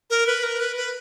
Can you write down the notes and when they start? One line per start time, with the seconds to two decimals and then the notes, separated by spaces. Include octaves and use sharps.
0.10 A#4
0.26 B4
0.43 A#4
0.59 B4
0.76 B4